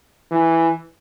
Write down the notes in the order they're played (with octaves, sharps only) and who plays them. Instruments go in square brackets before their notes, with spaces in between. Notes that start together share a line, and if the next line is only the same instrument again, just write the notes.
[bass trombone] E3